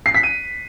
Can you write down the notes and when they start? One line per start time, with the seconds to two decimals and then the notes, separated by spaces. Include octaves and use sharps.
0.06 C7
0.14 B6
0.23 D#7